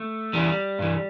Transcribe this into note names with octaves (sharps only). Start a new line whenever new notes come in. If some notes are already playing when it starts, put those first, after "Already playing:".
Already playing: A3
E2 E3 G3
G2 E3